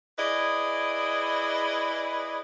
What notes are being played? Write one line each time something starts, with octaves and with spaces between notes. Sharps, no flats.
E4 G#4 B4 D5 D#5